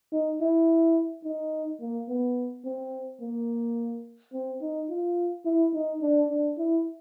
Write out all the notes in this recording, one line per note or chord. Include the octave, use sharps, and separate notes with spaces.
D#4
E4
D#4
A#3
B3
C4
A#3
C4
D#4
F4
E4
D#4
D4
D4
E4